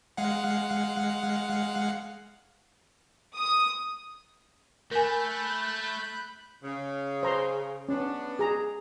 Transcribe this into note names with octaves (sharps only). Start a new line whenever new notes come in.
G#3 F5 F#5
D#6
A3 A#4 G#5 B5 F#6 G6
C#3
C5 A#5 C6
B3 C#4 D4
G#4 A#5